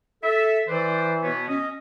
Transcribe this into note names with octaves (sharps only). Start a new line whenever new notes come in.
A4 E5
E3 B4 C5 D5
B2 B3 C#5
C#4 D#5